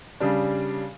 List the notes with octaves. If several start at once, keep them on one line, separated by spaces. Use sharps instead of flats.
C#3 G3 D4